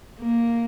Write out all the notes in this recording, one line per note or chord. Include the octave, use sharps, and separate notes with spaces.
A#3